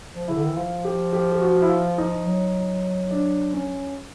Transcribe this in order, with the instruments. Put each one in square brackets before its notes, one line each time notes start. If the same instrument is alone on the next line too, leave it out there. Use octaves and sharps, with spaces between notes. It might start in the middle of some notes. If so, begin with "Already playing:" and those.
[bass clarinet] F3
[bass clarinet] C#3 [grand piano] E4
[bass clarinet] D3
D#3
E3
[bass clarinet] F3 [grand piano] F4
[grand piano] G4
G4
G4
F#4
E4
F4
D#4
[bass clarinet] F#3
[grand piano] D4
C#4